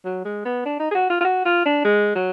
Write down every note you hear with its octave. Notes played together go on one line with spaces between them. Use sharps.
F#3
G#3
B3
D4
D#4
G#4
F#4
F4
F4
F#4
F4
D4
G#3
F#3